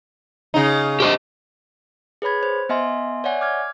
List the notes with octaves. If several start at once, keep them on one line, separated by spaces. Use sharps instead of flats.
C#3 D#4
G4 C5 D#5
G#4 B4 C#5 B5 G#6
C5
B3 D#5 E5 G#5 C6
C#5 D5 E5 F#5 G#5
D6 F6 G#6